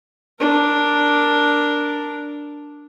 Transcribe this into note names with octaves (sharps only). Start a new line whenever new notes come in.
D4 A#4